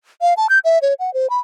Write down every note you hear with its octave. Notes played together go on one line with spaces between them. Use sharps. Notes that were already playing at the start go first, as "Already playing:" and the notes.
F5
A5
G6
E5
C#5
F#5
C5
B5